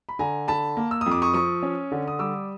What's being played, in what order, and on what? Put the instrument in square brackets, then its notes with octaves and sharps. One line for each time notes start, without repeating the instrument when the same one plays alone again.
[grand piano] B5
D3 G#5 A#5
D3 A5 B5
A#3
E6
F2 D#6
D6
C#6 D#6
F3 C#6 D#6
C#4
D3
D#6
G3 D6 E6